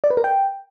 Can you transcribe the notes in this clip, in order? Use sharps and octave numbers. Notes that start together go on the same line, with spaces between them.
D5
B4
A#4
G5